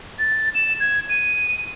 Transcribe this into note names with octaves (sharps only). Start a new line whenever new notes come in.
A6
E7
G#6
D#7